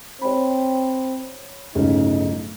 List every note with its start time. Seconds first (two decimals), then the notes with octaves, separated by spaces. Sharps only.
0.22 C4 C#5 B5
1.75 D1 G1 C#3 D#4